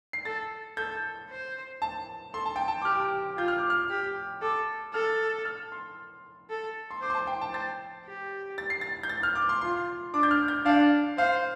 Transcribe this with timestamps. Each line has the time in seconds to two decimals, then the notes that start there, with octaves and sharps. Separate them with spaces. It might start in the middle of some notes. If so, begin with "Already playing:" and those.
0.13 C7
0.25 A4 A6
0.77 A4 G6
1.30 C5
1.82 A5
2.34 A4 C6
2.46 A5
2.56 G5
2.68 A5
2.82 D6
2.85 G4 F6
3.37 F4 G6
3.48 F6
3.59 D6
3.70 F6
3.90 G4
4.42 A4 D6
4.93 A4 F6
5.45 F6
5.72 C6
6.50 A4
6.91 C6
7.02 C5 D6
7.10 C6
7.15 A5
7.27 G5
7.41 A5
7.53 C5 A6
8.05 G4
8.58 A6
8.70 C7
8.81 A6
9.03 G6
9.09 A6
9.23 F6
9.35 D6
9.49 C6
9.61 F4 C6
10.14 D4 D6
10.23 G6
10.31 F6
10.48 G6
10.65 D4 F5
11.18 C5 F5